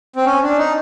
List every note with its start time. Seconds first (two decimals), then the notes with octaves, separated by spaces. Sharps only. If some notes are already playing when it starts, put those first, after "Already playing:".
0.16 C4
0.26 C#4
0.42 D4
0.58 D#4